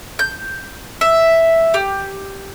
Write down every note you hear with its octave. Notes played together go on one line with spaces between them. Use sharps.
G6
E5
G4